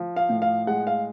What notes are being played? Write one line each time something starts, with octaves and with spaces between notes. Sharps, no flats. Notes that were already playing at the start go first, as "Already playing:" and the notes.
Already playing: F3
F5
A2
F5
G#3 F#5
F5